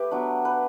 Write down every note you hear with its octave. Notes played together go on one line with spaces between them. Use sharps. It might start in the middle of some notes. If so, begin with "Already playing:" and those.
Already playing: A3 G4 B4
F#3 B3 D4
B4